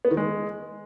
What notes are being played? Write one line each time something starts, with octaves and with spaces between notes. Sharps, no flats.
B3
D#3
G#3